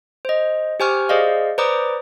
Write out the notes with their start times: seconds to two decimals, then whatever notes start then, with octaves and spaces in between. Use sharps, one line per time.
0.25 C5 D#5
0.80 G4 C5 G#5 C#6 F6
1.09 G#4 C5 D5 D#5 F5
1.58 B4 C5 D5 A#5 D6 D#6